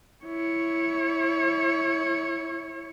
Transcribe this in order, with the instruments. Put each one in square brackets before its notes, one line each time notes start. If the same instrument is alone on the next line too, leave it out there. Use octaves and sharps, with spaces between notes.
[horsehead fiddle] E4 C#5